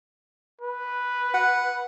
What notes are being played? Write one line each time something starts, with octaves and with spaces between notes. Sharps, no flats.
B4
F#5